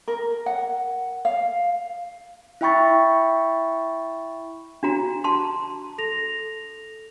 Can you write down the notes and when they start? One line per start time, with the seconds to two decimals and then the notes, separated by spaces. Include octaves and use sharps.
0.08 A#4
0.46 F#5
1.25 F5
2.61 E4 E5 G5 B5 C#6 A6
4.83 D4 F#4 A#5
5.24 A5 C6
5.98 A4 A#6 F7